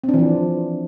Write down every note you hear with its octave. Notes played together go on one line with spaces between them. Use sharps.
C4
D4
E3
F3